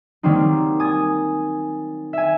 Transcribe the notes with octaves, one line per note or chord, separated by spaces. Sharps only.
D#3 F#3 G3 A#3 C4 D#4
G#5 D#6 A6
E5 G#5